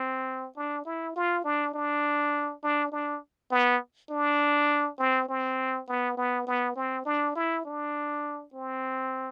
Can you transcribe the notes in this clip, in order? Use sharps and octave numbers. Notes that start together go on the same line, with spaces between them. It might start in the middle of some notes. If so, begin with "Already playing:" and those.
Already playing: C4
D4
E4
F4
D4
D4
D4
D4
B3
D4
C4
C4
B3
B3
B3
C4
D4
E4
D4
C4